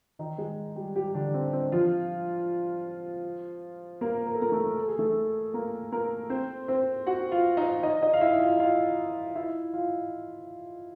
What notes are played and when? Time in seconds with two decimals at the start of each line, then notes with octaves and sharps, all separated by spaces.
0.19 D#3 D#4
0.38 G#3 G#4
0.76 G3 G4
0.96 G3 G4
1.14 D3 D4
1.34 C4
1.53 C4
1.72 F3 F4
4.01 A#3 A#4
4.27 A#4
4.35 A4
4.42 A#3 A#4
4.52 A3 A4
4.77 A4
4.88 G#4
4.99 A3 A4
5.54 A#3 A#4
5.92 A#3 A#4
6.30 C4 C5
6.68 C4 C5
7.06 F#4 F#5
7.31 F4 F5
7.57 D#4 D#5
7.83 D#4 D#5
8.02 D#4 D#5
8.13 F5
8.21 E4 E5
8.40 F4 F5
8.59 F4 F5
9.35 E4 E5
9.73 F4 F5